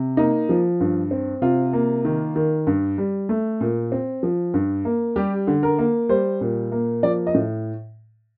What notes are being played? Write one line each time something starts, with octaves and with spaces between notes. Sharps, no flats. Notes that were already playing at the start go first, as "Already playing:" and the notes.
Already playing: C3
A#3 D#4
F3
G2
C4
C3 F4
A#3
D#3
D#3
G2
G3
A3
A#2
C4
F3
G2
A#3
G3 G4
D3
A#4
A#3
G3 C5
A#2
A#3
F3 D5
D#5
A2